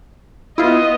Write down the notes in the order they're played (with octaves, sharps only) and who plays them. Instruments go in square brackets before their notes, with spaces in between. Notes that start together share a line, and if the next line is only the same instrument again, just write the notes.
[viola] B3 D#5 [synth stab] E4 F4